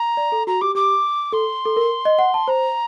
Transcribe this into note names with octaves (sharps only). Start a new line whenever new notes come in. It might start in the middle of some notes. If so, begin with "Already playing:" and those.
Already playing: A#5
D5
A4
F#4 A#5
G4 D6
G4 D6
A4 C6
A4
A#4
D#5
F#5
A5
C5 A#5